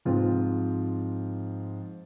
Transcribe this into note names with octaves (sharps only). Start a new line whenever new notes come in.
G#2 F3 C4 F4